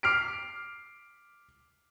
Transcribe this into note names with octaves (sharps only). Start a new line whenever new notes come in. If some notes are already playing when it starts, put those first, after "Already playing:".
D6 F6 C7 D7